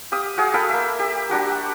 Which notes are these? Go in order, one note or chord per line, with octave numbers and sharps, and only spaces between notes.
G4 F5 D#6
F#4 G#4 F5
A4 F5 G5 B5
A#3 E5
G4
G3 D4 F#4 G4